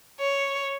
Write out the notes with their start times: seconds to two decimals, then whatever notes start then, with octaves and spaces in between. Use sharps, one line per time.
0.20 C#5